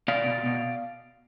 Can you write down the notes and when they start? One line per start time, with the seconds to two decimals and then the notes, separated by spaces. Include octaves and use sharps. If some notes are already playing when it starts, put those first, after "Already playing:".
0.08 B2 D5 F5
0.26 B2
0.46 B2